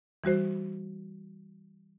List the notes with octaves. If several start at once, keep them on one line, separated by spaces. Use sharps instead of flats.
E3 G3 F#4 C5